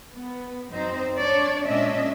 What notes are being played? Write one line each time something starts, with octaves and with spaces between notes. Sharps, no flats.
B3
F#2 C4 D#4 C5
D4 C#5 D5
A#2 G#3 C#4 D4 D#5 E5